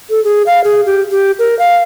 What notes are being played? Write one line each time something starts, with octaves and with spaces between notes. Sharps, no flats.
A4
G#4
F5
G#4
G4
G4
A#4
F5